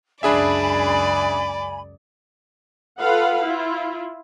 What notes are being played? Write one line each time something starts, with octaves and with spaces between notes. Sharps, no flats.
C#2 F#2 D4 G#4 D5 E5 G#5 B5
F4 A4 B4 F5 F#5
E4 F4